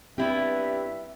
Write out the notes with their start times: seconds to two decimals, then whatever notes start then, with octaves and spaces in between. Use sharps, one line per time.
0.18 G2 B3 C4 E4 G4 E5